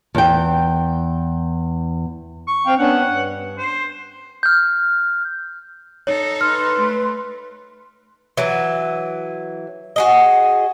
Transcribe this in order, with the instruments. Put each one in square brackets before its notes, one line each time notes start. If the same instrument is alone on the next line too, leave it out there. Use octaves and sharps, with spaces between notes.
[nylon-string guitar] E2 G5
[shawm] C#6
[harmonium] C4 F5 G5
[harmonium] B3 C#4 D4 [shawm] F#5
[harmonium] G2
[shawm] C5
[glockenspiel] F6 G6
[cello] D#4 A4 [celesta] C#5
[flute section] B4 C6 [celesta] F6
[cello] A3
[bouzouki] E3 F#3
F#4 G#4 D#5